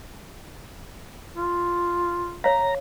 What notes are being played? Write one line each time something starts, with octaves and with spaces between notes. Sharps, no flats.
F4
C#5 F5 A#5